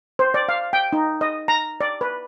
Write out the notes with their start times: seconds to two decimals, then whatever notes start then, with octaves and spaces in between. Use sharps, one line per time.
0.19 C5
0.34 D5
0.49 F5
0.73 G5
0.93 D#4
1.21 D#5
1.48 A#5
1.81 D5
2.01 B4